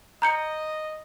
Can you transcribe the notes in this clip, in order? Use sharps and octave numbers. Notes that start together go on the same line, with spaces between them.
D#5 A#5 G6 C#7